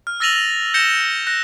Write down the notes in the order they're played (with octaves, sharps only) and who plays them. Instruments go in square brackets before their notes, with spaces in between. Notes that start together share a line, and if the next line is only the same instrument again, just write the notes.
[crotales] F6
E6 A6 A#6 D#7 F7 F#7
A#6 F7
G6 A#6 C#7 E7 G7
F#6 A#6